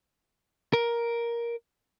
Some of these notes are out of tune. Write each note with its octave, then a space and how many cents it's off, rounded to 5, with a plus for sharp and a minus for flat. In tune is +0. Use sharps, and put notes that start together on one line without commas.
A#4 +10